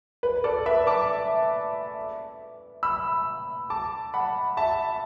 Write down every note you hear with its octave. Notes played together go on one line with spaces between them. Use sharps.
B4
A4 D5
B4 E5
A5 D6
B5 E6
A5 D6
F#5 B5
E5 A5